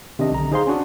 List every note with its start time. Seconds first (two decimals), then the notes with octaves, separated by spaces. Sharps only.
0.19 C3 D#3 D4 D#5
0.31 B1 D3 A#5
0.51 D#4 G#4 C5 F5 C6
0.67 C#4 D4 F#4